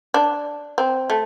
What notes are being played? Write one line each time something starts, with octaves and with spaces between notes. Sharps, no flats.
D4
C4
A3